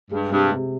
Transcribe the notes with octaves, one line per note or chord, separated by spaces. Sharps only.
G2 G#3
G2 C3
C3